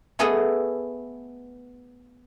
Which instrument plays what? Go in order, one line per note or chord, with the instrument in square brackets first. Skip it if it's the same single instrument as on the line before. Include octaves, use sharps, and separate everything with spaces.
[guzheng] A3 B3 G#4 A4 D#5 G#5